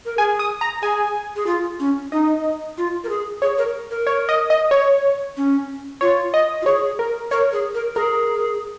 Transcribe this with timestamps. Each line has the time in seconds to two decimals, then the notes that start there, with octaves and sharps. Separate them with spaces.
0.06 A#4
0.18 G#4 G#5
0.39 D#6
0.61 A#5
0.82 G#4 G#5
1.36 G#4
1.47 F4
1.80 C#4
2.12 D#4 D#5
2.78 F4
3.04 A#4
3.09 G#4
3.42 G#4 C#5
3.58 A#4
3.91 A#4
4.07 C#5
4.29 D#5
4.50 D#5
4.71 C#5
5.37 C#4
6.01 F4 C#5
6.34 D#5
6.62 F4
6.66 G#4 C#5
6.99 A#4
7.31 A#4 C#5
7.53 G#4
7.75 A#4
7.96 G#4 A#4